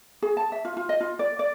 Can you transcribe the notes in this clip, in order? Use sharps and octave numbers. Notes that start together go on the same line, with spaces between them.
G#4
A5
E5
F4
F4
D#5
F4
D5
D5